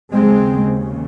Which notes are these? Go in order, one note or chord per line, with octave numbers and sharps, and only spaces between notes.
D#2 C#3 G#3 C4